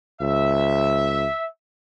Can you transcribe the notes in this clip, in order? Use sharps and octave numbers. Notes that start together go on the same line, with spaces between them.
C#2 E5